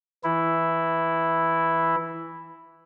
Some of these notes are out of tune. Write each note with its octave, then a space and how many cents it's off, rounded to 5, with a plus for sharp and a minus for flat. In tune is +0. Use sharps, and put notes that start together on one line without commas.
E3 +0 E4 +0